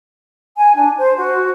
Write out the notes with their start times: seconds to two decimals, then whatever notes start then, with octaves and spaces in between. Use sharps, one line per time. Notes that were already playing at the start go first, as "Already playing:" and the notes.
0.58 G#5
0.76 D4
0.97 C5
1.17 F#4